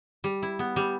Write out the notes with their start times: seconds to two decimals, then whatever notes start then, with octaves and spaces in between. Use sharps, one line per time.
0.24 G3
0.42 E4
0.59 B3
0.76 G3